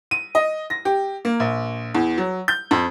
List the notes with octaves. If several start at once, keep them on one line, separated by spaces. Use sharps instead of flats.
D#7
D#5
A#6
G4
A#3
A#1
E2
F#3
G6
F2